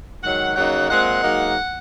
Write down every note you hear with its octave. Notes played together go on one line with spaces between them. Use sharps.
G#2 D#3 F#3 F#5
C#3 F#3 A#3 D#4 F#5
A#2 G#3 C4 F#5
G#2 F#3 A#3 D#4